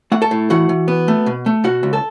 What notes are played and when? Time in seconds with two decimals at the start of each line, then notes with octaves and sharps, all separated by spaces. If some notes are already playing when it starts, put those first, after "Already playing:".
0.12 A3 F#5
0.22 A4 A5
0.31 A2
0.50 E3 F#4 F#5
0.69 E3
0.88 B3
1.08 A3
1.26 B2
1.46 A3
1.64 B2 F#4 F#5
1.83 C#2
1.93 A4 A5